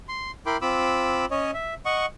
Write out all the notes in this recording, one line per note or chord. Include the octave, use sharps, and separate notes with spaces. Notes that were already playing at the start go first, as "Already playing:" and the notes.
C6
E4 A#4 G5 B5 C6 D6
C4 F4 B5 D6 E6
C#4 C#5 D#5
E5
D#5 F#5 C#6